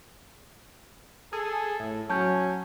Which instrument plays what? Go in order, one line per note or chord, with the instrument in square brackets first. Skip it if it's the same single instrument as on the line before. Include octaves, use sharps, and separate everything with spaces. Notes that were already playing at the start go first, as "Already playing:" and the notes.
[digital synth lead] G#4 [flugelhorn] A4
[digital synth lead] A2
[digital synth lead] F#3 [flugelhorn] C#4 [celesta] A5 G6